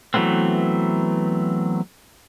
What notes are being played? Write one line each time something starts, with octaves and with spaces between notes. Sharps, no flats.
E3 F#3 A3 B3 C4